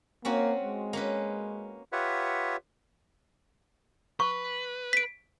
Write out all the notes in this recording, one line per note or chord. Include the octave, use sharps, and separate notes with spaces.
A#3 C4 C#4 F#4
G#3
A#3 C#4 B4
F4 G4 B4 C#5 E5 F#5
B4 C#6
B6 D7